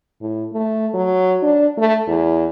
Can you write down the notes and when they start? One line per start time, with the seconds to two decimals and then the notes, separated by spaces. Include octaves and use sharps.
0.21 A2
0.53 A3
0.94 F#3
1.42 D4
1.77 A3
2.08 E2